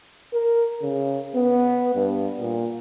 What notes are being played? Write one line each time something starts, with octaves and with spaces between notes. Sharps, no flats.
A#4
C#3
B3
G2
A#2